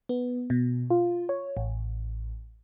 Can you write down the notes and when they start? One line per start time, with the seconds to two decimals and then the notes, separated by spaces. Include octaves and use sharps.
0.09 B3
0.50 B2
0.90 F4
1.29 C#5
1.57 A1